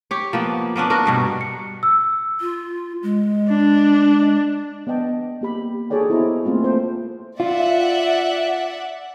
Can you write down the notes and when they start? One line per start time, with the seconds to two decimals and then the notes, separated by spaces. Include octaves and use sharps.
0.11 G4 C#5
0.33 F3 A#3 B3
0.76 A#3 B3 C#4 D4
0.90 D4 F#4 A#4
1.06 G2 B2 G3
1.41 C#7
1.83 E6
2.41 F4
3.03 G#3
3.49 D4
4.87 B3 D5 D#5 G5 A5
5.41 A#3 G4 B5
5.90 F#4 G#4 A4 C#5 D5 G5
6.09 B3 E4 A4 C5 D#5 A#5
6.45 A3 A#3 C4 F4
6.64 A4 C5 G5
7.40 F4 D5 E5 F#5